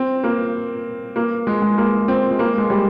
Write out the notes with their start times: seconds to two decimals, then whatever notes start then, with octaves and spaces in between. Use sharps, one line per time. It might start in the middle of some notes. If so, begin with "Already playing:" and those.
Already playing: C4
0.24 A#3
1.16 A#3
1.47 G#3
1.62 G#3
1.78 A#3
2.08 C4
2.31 G#3
2.39 A#3
2.58 G#3
2.70 G3